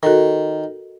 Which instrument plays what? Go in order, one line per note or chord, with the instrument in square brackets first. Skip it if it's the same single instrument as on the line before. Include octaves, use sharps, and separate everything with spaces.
[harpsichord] D#3 [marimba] F#4 A4 A#4